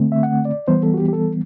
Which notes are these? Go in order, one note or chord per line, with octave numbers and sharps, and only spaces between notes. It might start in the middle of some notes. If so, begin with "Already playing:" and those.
Already playing: D3 A3 C4
E5
F#5
D5
E3 G3 B3 C5
A4
F#4
G4
G4
A4